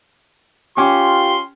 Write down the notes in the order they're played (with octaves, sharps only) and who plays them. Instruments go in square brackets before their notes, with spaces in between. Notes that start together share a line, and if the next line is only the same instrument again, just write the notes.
[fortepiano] C#4 [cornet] F4 [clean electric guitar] G4 [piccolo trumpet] C6